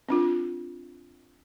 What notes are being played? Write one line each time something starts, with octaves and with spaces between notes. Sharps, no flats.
C4 D4 F4